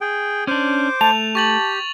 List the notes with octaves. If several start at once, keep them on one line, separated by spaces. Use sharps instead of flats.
G#4 G5
C#4 D4 C5 D6
A3 A5 F7
G4 C#6 A6 F#7